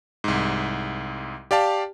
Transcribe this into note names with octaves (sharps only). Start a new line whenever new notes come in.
C2 G#2
G4 D5 F5 A5